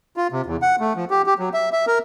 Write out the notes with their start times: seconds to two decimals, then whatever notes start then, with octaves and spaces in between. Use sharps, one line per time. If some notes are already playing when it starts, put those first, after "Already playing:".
0.17 F4
0.32 C3
0.46 E2
0.62 F#5
0.80 A3
0.96 F3
1.10 G4
1.26 G4
1.39 F#3
1.54 E5
1.73 E5
1.87 A#4